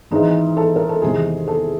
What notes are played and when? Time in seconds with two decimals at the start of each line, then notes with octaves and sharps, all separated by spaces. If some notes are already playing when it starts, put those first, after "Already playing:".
0.11 G#1 G#2 E3 G#3 D#4
0.57 A4
0.76 A#4
0.89 A4
1.02 E2 C3 D#3 G#3 G#4
1.48 A4